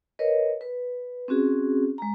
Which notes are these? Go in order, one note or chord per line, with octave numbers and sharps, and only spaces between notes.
A#4 B4 C#5 D#5
B4
C4 C#4 F#4 G#4
G#3 A#5